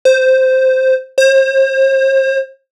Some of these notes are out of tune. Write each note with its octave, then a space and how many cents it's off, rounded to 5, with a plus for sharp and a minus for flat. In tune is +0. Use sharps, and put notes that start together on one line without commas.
C5 -5
C5 +40